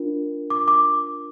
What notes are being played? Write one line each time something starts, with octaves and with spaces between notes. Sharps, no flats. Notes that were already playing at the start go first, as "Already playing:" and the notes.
Already playing: D4 F4 A#4
D6
D6